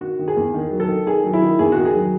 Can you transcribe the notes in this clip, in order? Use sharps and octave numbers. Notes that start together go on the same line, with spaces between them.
D#3 F#4
D#3
G#4
E2
D#3
F#3
A4
D#3
D#3 G#4
F#3
E4
D#3
E2 G#4
D#3 F#4
G#4
F#3